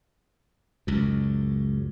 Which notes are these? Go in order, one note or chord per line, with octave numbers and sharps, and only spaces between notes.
C#2 F#2